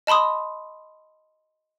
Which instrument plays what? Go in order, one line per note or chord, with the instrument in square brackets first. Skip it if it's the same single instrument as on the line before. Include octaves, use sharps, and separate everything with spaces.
[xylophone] D#5 A5 B5 C6 D#6